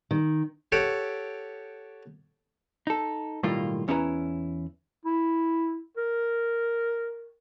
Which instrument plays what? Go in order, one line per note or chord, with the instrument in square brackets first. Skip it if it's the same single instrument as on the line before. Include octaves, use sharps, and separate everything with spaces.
[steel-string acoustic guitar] D#3
[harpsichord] G4 A4 C#5 F#5 G5
[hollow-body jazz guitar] D#4 A4
B1 A2 D#3 G3 A#3 F4
E2 C#4 E4 G4 B4 A#5
[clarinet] E4
A#4